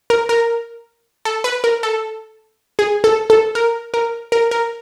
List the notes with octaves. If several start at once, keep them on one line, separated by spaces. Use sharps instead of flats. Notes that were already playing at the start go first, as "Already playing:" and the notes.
A#4
A#4
A4
B4
A#4
A4
G#4
A4
A4
A#4
A#4
A#4
A#4